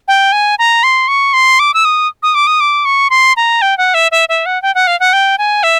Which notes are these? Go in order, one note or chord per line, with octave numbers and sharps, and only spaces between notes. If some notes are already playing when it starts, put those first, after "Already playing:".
G5
G#5
A#5
C6
C#6
C6
D6
E6
D#6
D#6
D6
D#6
D6
C#6
C6
A#5
G5
F#5
E5
E5
E5
F#5
G5
F#5
F5
F#5
G5
G#5
E5